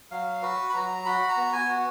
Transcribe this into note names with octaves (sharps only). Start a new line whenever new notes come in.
F#3 F5
F#4 B4
B5
F#3 A#5
F#4 B5
A#5
B3
G#5
F#4